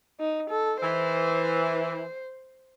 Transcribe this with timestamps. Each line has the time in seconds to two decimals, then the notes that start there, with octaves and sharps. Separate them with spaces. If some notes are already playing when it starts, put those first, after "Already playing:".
0.20 D#4
0.50 A4
0.83 E3 C5